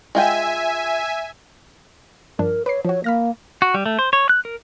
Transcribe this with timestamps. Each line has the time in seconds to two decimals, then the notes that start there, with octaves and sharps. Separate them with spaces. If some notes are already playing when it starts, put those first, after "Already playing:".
0.15 G#3 F4 E5 G5 G#5
2.39 G2 F3 D4 A#4
2.66 B4 C#5 D6 C7
2.85 F3 F#4 C#5
3.04 A#3 B5 F6 A#6
3.62 F#4
3.74 G3
3.86 A3
3.99 C5
4.13 C#5
4.29 F#6
4.45 A#4